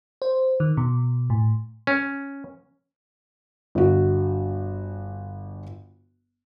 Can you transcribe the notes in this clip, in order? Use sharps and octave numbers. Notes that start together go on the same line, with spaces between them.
C5
D#3
B2
A2
C#4
G1 F#4